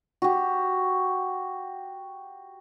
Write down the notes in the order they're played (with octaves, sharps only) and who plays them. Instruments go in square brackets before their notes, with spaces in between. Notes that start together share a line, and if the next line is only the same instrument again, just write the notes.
[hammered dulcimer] F#4 G4